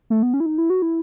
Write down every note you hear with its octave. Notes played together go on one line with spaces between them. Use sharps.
A3
B3
C#4
E4
D#4
E4
F#4
E4